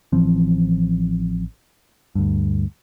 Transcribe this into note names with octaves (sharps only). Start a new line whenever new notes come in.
A1 E3 F3 C4
D2 G2